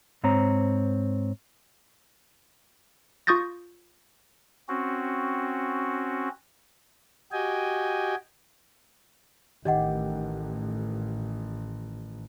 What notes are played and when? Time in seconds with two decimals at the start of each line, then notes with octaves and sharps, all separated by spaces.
0.23 G#2 C4 C#5 A#5
3.27 F4 C#6 D#6 G6 A6 A#6
4.68 C4 C#4 F#4
7.32 F#4 G4 D#5 G5 G#5
9.65 A1 D#3 G4 D5 D#5 F#5